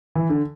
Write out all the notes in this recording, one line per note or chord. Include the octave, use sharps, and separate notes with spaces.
E3
D3